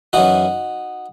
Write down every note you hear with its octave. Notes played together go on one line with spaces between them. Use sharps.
F#2 E3 D#4 F#4